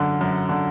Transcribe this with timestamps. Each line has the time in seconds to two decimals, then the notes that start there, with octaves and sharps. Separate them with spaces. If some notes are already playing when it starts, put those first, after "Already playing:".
Already playing: F#2 D3
0.21 F#2
0.49 D3